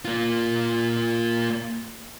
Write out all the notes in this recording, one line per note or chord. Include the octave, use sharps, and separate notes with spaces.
A#3 F4